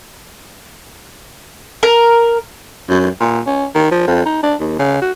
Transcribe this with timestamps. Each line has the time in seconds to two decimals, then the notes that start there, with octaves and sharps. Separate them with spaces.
1.83 A#4
2.89 F#2
3.20 A#2
3.46 C#4
3.75 D#3
3.91 F3
4.07 F2
4.26 D#4
4.43 D4
4.60 D#2
4.79 C#3
5.02 F#4